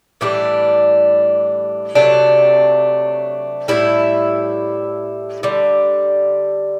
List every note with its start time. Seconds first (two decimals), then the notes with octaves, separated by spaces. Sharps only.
0.21 A2 E3 G3 D4
1.95 C3 F#3 A3 D4
3.68 A2 G3 E4
5.43 D3 G3